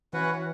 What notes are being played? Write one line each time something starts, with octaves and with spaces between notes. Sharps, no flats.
E3 C#4 F#4 B4 F#5